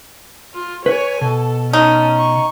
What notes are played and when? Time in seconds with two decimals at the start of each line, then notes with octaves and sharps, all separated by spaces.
0.54 F4
0.86 B4 C#5 G#5
1.21 B2 A4
1.73 C#4 D#4 A5
2.17 C#6